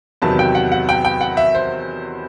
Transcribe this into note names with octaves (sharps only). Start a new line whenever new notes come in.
E2 C3 D#3 F#3 B3 A5
G5
F#5
F#5
G5
G5
F#5
E5
C5